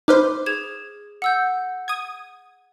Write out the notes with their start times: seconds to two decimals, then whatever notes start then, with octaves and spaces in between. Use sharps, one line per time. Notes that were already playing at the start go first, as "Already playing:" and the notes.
0.08 D#4 B4 C5 D6 F6
0.46 G#4 G#6 E7
1.22 F#5 E6 G6
1.88 D#6 G#6